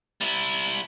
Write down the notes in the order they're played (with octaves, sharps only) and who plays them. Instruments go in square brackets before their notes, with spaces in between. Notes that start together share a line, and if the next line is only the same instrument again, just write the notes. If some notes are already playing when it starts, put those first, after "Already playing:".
[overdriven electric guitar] G3 E4